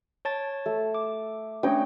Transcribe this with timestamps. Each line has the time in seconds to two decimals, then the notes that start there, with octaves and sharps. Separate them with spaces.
0.25 C#5 A5 A6
0.66 A3
0.94 D6
1.63 A3 C#4 D4 C#5 G5